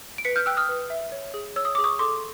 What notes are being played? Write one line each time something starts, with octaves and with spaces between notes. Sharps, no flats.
D7
B4 B6 C#7
F6 G6
G5 E6 F#6
D#6 F6
B4
E5
C#5
G#4
C#5 E6
D#6
G#4 D6
C#6 D#6
A4 C6 D6